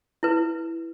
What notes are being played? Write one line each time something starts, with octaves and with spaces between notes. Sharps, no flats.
E4 B4